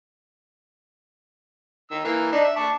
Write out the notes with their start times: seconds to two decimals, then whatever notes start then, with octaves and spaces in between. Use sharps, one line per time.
1.91 D#3 E6
2.05 E3 A#3
2.32 D4 D#4
2.44 E5
2.56 A5 C#6 D6